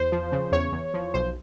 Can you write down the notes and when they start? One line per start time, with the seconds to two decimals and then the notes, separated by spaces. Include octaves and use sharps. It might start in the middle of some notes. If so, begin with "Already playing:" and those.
Already playing: E2 C5
0.12 F3
0.32 C#3
0.52 E2 C#5
0.72 E2
0.94 F3
1.14 B1 C5